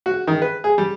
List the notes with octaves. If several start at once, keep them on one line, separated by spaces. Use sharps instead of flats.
F#4
D#3
B4
G#4
G3